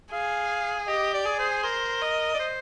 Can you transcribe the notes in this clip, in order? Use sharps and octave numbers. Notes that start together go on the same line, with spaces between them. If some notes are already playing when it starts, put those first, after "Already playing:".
G#4 F5
G4 D#5
D5
G#4
C5
A#4 C5
D#5
D5
C5